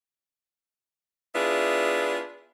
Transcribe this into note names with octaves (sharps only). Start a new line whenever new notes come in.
B3 D4 E4 F4 G#4